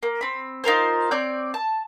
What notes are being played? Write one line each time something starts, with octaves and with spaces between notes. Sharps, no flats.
A#3
C4 B5
D#4 F4 A#4 C5
C4 C#5 D5 G6
A5